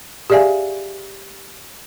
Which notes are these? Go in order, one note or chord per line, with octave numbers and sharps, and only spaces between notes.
G4 G#4 D5 E5 F5 G#5